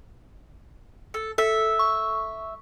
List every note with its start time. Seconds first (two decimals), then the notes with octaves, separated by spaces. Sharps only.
1.14 A4
1.38 A4 E5
1.79 C#6